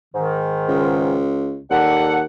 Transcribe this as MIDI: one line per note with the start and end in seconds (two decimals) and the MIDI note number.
0.15 1.18 44
0.15 1.18 51
0.68 1.59 37
1.70 2.23 39
1.70 2.19 55
1.70 2.19 69
1.70 2.19 78